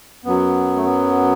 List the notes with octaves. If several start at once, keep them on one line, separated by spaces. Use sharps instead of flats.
F#2 F#3 B3
A3
B3